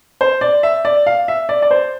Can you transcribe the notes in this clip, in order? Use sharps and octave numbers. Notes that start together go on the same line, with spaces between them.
C5
D5
E5
D5
F5
E5
D5
D5
C5